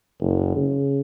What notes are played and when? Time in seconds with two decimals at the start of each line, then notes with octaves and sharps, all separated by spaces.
0.21 F#1
0.56 C#3